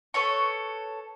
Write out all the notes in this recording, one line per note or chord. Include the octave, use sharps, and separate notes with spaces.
A4 B4 C#5 C#6